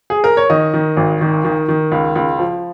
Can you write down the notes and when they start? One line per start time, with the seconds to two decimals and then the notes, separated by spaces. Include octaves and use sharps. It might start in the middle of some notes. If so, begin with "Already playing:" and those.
0.10 G#4
0.24 A#4
0.37 C#5
0.50 D#3 D#5
0.74 D#3
0.97 G#1
1.21 D#3
1.45 D#3
1.68 D#3
1.92 C#2
2.16 C#2
2.39 F3